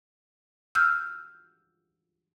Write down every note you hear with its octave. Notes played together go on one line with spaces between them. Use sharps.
E6 F6 G6